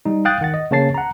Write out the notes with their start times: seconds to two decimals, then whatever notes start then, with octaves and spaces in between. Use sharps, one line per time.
0.05 G3 D#4
0.25 F5 G5 D#6 F#6 A6
0.41 D#3 F#5 A6
0.54 D#5
0.71 C#3 A#3 C#5 A5 A6 C7
0.94 F#5 A#5